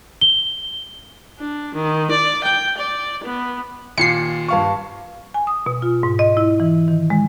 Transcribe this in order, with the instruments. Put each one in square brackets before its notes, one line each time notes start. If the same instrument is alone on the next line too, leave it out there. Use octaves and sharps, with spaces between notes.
[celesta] G7
[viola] D4
D#3
D5
G5
D5
B3
[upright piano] D#2 A#2 [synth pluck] C7 C#7
[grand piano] G2 F5 C#6
[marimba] G#5
D#6
B2
F4
G#2
D#5
E4
E3
D#3
G#3